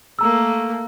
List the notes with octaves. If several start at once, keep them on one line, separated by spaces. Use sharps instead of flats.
A3 A#3 A#5 E6